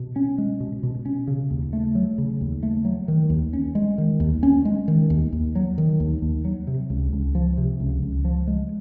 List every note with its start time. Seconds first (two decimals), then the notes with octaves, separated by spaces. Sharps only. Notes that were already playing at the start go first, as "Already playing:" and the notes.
Already playing: B2
0.16 C#4
0.38 G#3
0.60 B2
0.83 B2
1.06 C#4
1.27 C#3
1.51 D#2
1.73 A3
1.95 F#3
2.18 C#3
2.41 D#2
2.63 A3
2.85 F#3
3.08 D#3
3.30 D#2
3.53 C#4
3.75 G#3
3.98 D#3
4.20 D#2
4.43 C#4
4.65 G#3
4.88 D#3
5.10 D#2
5.33 D#2
5.55 F#3
5.78 D#3
6.00 D#2
6.22 D#2
6.45 F#3
6.67 C3
6.90 C#2
7.13 C#2
7.35 F3
7.58 C3
7.80 C#2
8.02 C#2
8.25 F3
8.47 G#3